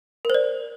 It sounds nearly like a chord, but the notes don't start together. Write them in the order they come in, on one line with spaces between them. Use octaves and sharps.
A#4 C5 D5